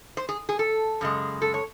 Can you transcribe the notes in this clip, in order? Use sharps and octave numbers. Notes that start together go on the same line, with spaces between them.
C5
G#4
G#4
A4
F#2 C#3 G#3
A4
C#5